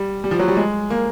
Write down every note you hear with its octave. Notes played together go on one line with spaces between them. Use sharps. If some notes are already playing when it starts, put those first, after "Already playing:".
Already playing: G3
G3
F3
F#3
G3
G#3
A#3